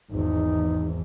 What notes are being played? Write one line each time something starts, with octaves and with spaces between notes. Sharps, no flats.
G#1 E2 D#4